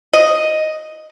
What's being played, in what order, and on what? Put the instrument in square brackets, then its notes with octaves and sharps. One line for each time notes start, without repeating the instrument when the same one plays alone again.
[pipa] D#5